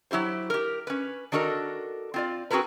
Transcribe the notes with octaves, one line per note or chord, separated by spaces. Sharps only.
F#3 E4 G4 C5
G4 A#4
C#4 B4
D#3 D4 F#4 A4 A#4
C4 F4 D5
C4 F#4 G#4 A#4 B4